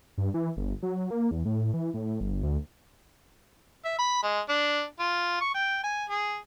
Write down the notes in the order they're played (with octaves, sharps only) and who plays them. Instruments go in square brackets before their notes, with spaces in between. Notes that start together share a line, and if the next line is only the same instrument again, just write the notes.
[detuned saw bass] G2
E3
G1
F#3
A#3
E2
A2
E3
A2
G1
D2
[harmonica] E5
B5
G#3
D4
F4
C#6
G5
G#5
G#4